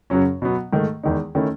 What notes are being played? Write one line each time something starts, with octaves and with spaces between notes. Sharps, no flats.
F#2 C#3 F#3 C#4
B2 F#3 B3
G#2 D#3 A3
E2 D#3 G#3 D#4
D#3 A3 C#4 E4